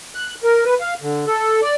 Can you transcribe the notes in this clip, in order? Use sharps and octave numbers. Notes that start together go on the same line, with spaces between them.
F#6
A#4
B4
F5
D3
A4
D5